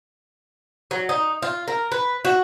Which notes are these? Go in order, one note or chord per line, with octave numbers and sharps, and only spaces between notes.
F#3
D#4
F4
A#4
B4
F#4